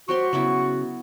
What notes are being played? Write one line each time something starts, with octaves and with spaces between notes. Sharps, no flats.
F#3 F#4 G4 C5 C6 C#6
C#3 F#3 B3 E4